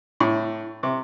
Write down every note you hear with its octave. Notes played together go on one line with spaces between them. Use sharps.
A2
C3